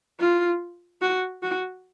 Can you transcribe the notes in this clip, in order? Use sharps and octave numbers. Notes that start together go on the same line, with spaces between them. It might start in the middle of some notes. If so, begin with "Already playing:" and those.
F4
F#4
F#4